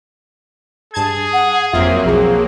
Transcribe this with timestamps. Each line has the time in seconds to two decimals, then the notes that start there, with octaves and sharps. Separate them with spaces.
0.94 G2 G#4 A5 G#6
1.33 F#5
1.73 G1 F2 F#3 A#3 C4 F4 E5
2.06 B1 F3 G#4 A#4